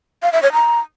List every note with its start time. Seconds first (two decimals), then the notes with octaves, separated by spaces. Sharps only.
0.23 F5
0.33 E5
0.43 C#5
0.53 A#5